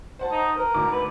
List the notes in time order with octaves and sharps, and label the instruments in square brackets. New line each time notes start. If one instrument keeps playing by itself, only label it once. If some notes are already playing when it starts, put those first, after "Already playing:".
[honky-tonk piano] C5 F#5 A5
[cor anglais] D#4
[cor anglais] A#4 [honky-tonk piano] B4
[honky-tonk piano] D2 G#2 D6
[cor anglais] B4